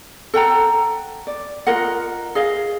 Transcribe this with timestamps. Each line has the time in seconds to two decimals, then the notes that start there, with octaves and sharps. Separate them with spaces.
0.34 A4 F#5 G5 A#5
1.27 D5
1.67 F4 A#4 D#5 F#5
2.35 G#4 D#5 F5